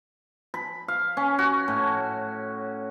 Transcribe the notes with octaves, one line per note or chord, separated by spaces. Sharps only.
B5
F5
C#4
F#4
A2